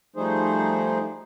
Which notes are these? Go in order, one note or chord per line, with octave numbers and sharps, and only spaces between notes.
F3 G3 A3 D#4 G#4 C5